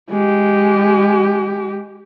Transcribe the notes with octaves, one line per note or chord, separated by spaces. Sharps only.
G#3 G4